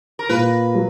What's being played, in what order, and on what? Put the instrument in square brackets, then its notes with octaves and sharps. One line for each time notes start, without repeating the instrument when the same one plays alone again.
[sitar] A#4
[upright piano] A#2 [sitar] B4
[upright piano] F#3